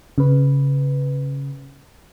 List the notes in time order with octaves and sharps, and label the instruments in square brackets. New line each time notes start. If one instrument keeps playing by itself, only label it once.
[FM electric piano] C#3 B4